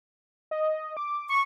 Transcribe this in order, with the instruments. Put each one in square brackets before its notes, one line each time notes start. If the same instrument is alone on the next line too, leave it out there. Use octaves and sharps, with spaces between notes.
[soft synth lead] D#5
D6
[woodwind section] C#6